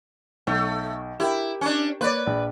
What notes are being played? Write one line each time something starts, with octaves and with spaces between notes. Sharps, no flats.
B1 A3
E4 G4 A#4 G5
C#4 D4
A#3 B4 C#5 D5
A#1